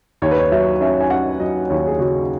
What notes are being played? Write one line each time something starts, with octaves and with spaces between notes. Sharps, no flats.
D#2 C#5
B4
C#5
F#3 E5
C#4 E5
G#5
C#4 F#5
F#3 D#5
D#2 C#5
G#4
C#3 F#4